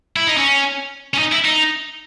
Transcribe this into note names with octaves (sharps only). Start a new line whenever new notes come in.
E4
D#4
C#4
C#4
D#4
E4
D#4